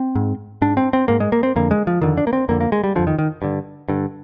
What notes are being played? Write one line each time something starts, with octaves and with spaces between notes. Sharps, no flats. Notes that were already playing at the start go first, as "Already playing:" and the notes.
Already playing: C4
G#2
G#2 D4
C4
C4
G#2 A#3
G#3
A#3
C4
F2 D3 A#3
G#3
F3
F2 D3 D#3
D4
A#3
C4
F2 D3 A#3
A#3
G#3
G3
F2 D3 F3
D#3
D#3
G2 D3
G2 D3